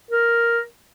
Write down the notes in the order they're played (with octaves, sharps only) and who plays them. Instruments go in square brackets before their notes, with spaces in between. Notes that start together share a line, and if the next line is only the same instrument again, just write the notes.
[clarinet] A#4